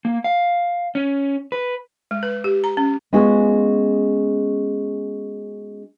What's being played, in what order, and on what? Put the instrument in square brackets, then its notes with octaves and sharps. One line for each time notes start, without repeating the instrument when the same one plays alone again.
[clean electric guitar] A#3
F5
C#4
B4
[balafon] G#3
B4
G4
A#5
C#4
[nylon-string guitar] G#3 B3 C#4 F4 F#4 G#4